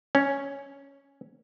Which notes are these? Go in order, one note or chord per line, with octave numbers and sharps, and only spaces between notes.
C#4